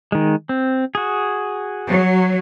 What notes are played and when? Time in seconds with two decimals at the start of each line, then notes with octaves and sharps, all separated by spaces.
0.12 D#3 G#3
0.49 C4
0.95 F#4 G#4
1.87 F#3